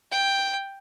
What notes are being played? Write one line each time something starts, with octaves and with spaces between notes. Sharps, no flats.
G5